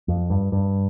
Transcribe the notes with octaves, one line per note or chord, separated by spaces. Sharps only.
F2
G2
G2